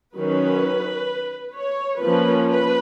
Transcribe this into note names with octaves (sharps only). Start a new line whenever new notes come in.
D#3 F#3 C#4 B4
C#5
F3 A#3 C#4 B4
B4